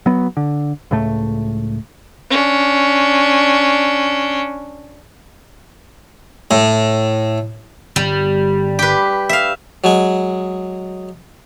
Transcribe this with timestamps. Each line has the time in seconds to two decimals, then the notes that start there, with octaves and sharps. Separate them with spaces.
0.06 F#3 B3
0.37 D3
0.91 C#2 A2 A3
2.30 C#4 D4
6.51 A2
7.96 G1 G3
8.79 G4 B4
9.29 E5 F5
9.84 F#3 G#3 G#5